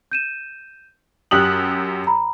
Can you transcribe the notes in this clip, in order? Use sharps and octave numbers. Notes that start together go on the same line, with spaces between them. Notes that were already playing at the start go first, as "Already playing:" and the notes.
G6 D#7 E7
F#2 G4 D#6 E6 F#6 F#7
A#5 B5